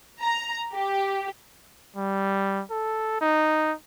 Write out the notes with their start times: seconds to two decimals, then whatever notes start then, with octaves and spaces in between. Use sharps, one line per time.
0.20 A#5
0.72 G4
1.96 G3
2.70 A4
3.21 D#4